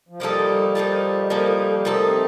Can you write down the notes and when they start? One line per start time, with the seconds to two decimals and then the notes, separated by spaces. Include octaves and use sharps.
0.09 F3
0.20 F3 G3 A#3 D#4 A4
0.75 F3 A#3 D#4 A4
1.30 F3 A#3 D#4 A4
1.85 F3 A3 A#3 D#4 A4
2.04 C4